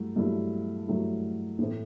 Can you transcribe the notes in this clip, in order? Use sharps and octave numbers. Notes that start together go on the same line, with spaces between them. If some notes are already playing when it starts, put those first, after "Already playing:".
Already playing: G2 F#3 A3 E4
G2 F#3 A3 E4
G2 F#3 A3 E4
A2 E3 A3 C4